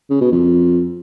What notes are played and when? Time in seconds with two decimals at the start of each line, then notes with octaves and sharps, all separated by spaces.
0.10 C#3
0.21 B2
0.32 F2